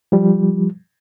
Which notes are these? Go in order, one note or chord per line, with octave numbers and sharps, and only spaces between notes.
F3 G3